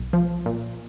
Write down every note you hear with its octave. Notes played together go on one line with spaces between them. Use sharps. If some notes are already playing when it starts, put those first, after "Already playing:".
Already playing: B1
F3
A#2